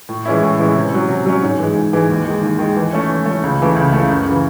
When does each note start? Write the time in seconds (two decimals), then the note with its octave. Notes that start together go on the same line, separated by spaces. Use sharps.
0.09 A2
0.26 E3 G#3 C#4 E4
0.43 A2
0.59 E3 G#3 C#4 E4
0.75 C3
0.92 F#3 C#4
1.09 C3
1.26 F#3 C#4
1.42 G#2
1.59 E3 G#3
1.75 G#2
1.93 E3 G#3
2.09 D#2
2.26 D#3 G#3
2.43 D#2
2.59 D#3 G#3
2.76 E3
2.93 A3 C#4
3.09 E3
3.26 A3
3.31 C#4
3.43 C#2
3.60 C#3 E3 A3
3.76 C#2
3.92 C#3 E3 A3
4.09 F#2
4.26 C#3
4.31 E3